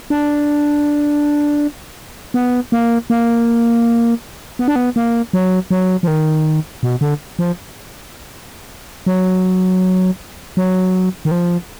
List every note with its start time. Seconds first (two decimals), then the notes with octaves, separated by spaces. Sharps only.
0.10 D4
2.34 B3
2.72 A#3
3.10 A#3
4.59 B3
4.68 D4
4.76 B3
4.96 A#3
5.33 F#3
5.71 F#3
6.03 F3
6.07 D#3
6.83 B2
7.01 D3
7.39 F3
9.06 F#3
10.57 F#3
11.25 D#3
11.31 F3